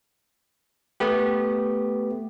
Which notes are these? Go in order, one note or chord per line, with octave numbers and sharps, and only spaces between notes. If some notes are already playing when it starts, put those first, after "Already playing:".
A3 B3 G4